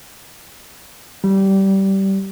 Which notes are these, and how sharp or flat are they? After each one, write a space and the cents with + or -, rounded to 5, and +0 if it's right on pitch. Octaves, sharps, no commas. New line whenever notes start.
G3 -20